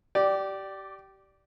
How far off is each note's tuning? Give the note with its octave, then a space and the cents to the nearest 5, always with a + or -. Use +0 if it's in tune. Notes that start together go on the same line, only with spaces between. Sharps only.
G4 -25 D5 +0